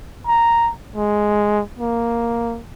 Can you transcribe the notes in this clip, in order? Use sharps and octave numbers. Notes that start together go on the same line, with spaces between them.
A#5
G#3
A#3